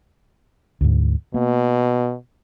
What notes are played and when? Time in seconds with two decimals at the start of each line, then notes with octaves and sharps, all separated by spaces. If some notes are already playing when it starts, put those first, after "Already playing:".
0.81 D2 G#2
1.34 B2 A#3